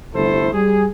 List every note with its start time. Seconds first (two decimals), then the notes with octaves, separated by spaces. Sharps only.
0.14 G1 C2 A3 E4 A4 C5
0.53 G3 G#4